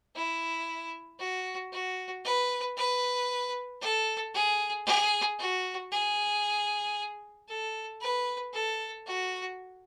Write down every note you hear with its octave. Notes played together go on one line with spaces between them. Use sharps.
E4
F#4
F#4
B4
B4
A4
G#4
G#4
F#4
G#4
A4
B4
A4
F#4